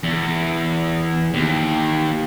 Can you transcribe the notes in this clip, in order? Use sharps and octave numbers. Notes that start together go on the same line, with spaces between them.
E2
D#2